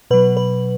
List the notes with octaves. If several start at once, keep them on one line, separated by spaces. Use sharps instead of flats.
B2 F#3 B4
B4